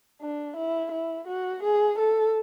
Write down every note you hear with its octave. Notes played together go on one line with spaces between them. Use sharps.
D4
E4
E4
F#4
G#4
A4